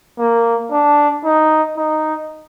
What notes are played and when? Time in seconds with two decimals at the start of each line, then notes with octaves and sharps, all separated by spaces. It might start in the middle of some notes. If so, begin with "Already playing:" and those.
0.19 A#3
0.71 D4
1.25 D#4
1.77 D#4